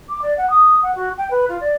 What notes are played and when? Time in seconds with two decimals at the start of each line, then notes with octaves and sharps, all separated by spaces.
0.09 D6
0.21 D5
0.37 F#5
0.50 D#6
0.82 F#5
0.95 F#4
1.17 G5
1.30 B4
1.48 F4
1.60 D5